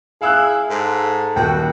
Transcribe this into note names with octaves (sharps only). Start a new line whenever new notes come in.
E4 G#4 F5 E6 F#6
G#2 A4
D#1 F#4 G5